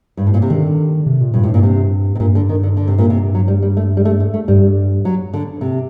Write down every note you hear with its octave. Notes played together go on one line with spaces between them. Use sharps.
G2
A2
A#2
C3
D3 D#3
C3
A#2
G2 A#2
A2
G2
A#2
C3
C3
G2 A#2
D3
D#3
D3
D3
C3
A#2
C3
F#3
G3
G3
A3
G3
A3
A3
A3
G2 G3
F#3
D3
C3